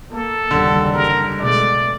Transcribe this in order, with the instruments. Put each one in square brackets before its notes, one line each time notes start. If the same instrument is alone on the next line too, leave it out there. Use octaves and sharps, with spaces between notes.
[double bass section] A#3 [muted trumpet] A4
[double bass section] F#1 D#2 G3 [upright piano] D3
[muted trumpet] A#4
[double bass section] B2 G#3 A3 [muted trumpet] D5